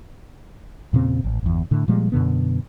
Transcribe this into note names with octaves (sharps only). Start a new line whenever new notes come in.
E2 A#2 C#3 C4
A1
G1 E2
A2 D3
A#2 F3 G3 G#3
F#2 B2 D3 B3